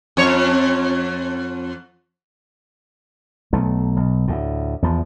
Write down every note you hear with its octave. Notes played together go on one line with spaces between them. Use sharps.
F2 C#5
B1 A3
B1
D2 A2
E2 F3